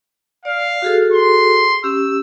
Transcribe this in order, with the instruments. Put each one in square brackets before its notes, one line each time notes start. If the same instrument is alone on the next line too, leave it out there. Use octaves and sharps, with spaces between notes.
[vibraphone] D5 [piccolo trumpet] F5
[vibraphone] F#4 G#4 A4
[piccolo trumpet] C6
[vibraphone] C#4 G4 [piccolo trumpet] E6